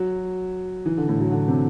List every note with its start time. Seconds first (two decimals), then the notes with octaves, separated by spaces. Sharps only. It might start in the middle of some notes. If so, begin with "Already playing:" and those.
Already playing: F#3
0.86 E3
0.97 D3
1.09 A2
1.21 F#3
1.32 D3
1.48 C3